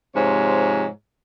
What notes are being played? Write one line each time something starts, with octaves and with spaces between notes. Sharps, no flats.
G#2 C3 F3 C#5